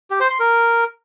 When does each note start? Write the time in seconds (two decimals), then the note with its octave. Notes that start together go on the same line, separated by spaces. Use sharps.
0.11 G4
0.20 C5
0.30 C6
0.40 A#4